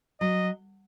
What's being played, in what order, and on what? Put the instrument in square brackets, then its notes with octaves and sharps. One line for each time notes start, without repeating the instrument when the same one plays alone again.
[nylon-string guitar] F#3 [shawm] D#5